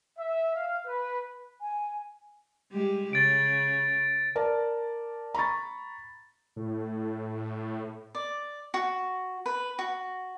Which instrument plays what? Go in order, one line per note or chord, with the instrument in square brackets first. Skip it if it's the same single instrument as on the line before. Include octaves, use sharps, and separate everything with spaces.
[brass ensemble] E5
F5
B4
[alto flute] G#5
[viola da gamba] G3 G#3 G4
[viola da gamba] C#3 [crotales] A6 D7
[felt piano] A#4 D5 A5
A#5 B5 C#6 A6
[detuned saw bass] A2
[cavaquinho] D5
F#4
B4
F#4